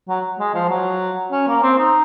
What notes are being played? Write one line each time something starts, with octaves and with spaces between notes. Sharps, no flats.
F#3
G#3
F3
F#3
C#4
A#3
C4
D#4